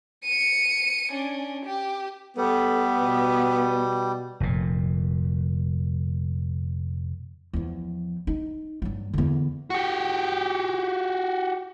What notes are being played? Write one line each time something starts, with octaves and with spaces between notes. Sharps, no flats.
C#7 D#7
C#4 D4
G4
G3 B3 A4
B2
F1 A#2
E2 F3
D#4
G2 F#3
E2 D3
F#4 G4